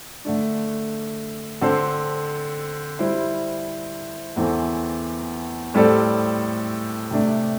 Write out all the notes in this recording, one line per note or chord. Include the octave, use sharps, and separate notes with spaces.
D3 A3 D4
D3 C4 A4 C5
G3 E4 C5
E2 E3 C4 A4
A2 G3 C4 A4 D5
C3 A3 D4